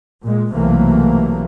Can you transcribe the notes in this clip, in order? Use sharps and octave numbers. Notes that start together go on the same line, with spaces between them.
A#2 G#3
B1 C3 E3 F#3 A3 A#3